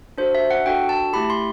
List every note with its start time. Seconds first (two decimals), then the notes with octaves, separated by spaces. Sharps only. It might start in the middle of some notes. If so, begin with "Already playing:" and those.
0.18 D4 F#4 A4 C5
0.35 E5
0.50 F#5
0.66 D4 F#4 A4 G5
0.89 A5
1.13 A3 E4 G4 B5
1.30 C6